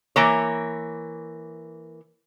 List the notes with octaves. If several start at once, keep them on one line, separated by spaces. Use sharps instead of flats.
E3 A#3 C#5